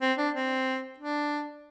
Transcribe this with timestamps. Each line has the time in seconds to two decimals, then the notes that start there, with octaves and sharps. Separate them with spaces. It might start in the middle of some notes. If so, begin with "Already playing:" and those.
0.02 C4
0.18 D4
0.35 C4
0.99 D4